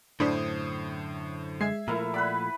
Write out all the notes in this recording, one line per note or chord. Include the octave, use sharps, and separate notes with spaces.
F#2 A2 D3 D4 C5 B5 D#6
G#3 G#4 E5 G#6 C7
A#2 F3 A3 E4 A#4
B4 D5 F#5 B5